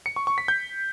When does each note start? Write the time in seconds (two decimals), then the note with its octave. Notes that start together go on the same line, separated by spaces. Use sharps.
0.06 C#7
0.16 C#6
0.27 C#6
0.38 B6
0.48 G6